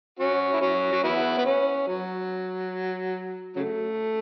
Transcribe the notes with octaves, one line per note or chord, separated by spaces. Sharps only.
C#4 F#4
E4
C#4 F#4
F#4
B3 E4
B3
C#4
F#3
C#3 F#3 A3